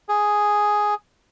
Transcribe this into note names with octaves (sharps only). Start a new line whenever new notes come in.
G#4